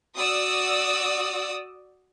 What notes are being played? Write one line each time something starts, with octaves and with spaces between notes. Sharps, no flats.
F#4 D5 D#6 E6